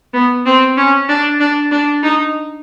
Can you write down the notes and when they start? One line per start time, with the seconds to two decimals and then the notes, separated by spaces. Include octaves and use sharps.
0.13 B3
0.46 C4
0.77 C#4
1.09 D4
1.40 D4
1.71 D4
2.03 D#4